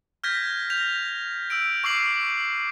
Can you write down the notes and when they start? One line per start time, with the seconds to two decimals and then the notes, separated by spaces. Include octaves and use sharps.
0.24 F6 G6 G#6 A#6 B6
0.70 G6 A#6 F7
1.50 E6 G6 D7
1.84 C#6 D6 E6 C7 F#7